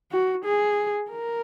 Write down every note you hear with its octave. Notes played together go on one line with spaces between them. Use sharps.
F#4
G#4
A#4